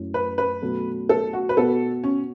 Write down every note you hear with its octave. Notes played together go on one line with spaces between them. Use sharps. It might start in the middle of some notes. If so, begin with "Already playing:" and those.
Already playing: F#2 F#3 A3 C#4 E4
B4
B4
B2 F#3 A3 C#4 A4
A4
F#4
B4
B2 B3 F#4 A4
C#4